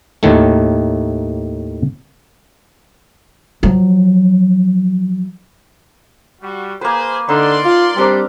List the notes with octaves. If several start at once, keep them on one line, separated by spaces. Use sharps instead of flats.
D#2 A2 D#3 A3
F3 F#3
G3 F#4
A#3 G#4 B4 C5
D3 D#4 D5 C6
F4
G3 C4 D4 A#4